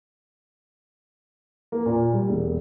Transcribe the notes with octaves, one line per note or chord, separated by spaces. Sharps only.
A#3
A#2
G3
E1